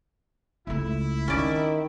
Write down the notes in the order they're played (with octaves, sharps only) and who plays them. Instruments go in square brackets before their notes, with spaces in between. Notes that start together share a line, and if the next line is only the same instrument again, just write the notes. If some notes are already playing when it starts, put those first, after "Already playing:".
[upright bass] C#2 A3 [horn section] E4
[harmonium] D#3 [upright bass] C4 [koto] C#4 D5